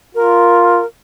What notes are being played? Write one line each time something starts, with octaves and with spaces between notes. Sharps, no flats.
F4 A#4